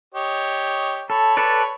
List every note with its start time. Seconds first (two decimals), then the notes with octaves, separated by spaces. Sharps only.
0.14 G4 C#5 D#5
1.10 A4 C#5 B5
1.37 A4 B4 D5